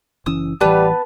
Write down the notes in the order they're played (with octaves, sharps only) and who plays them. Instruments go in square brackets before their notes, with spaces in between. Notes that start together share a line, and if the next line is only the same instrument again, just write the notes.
[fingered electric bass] F#1 E3 C#4 [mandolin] D#6 E6
[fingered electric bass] A1 E3 [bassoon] G3 [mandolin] B3 B4 A5